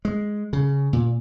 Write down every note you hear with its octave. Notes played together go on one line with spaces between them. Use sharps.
G#3
C#3
A#2